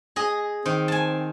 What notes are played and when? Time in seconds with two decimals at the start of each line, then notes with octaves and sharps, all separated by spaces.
0.16 G#4 D#5
0.66 D#3 C4
0.88 G#5 A5